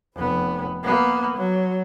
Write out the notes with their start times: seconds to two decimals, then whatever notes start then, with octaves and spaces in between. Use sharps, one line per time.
0.15 F1 B3
0.83 A#3 B3
1.37 F#3